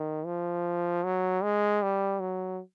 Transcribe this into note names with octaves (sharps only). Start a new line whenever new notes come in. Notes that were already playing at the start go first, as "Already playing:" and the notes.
Already playing: D#3
F3
F#3
G#3
G3
F#3